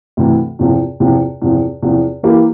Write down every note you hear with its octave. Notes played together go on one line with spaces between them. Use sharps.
D2 C3 E3
E2 C3 F3
E2 C3 F3
E2 C3 F3
E2 C3 F3
E3 A#3 E4 G4 A#4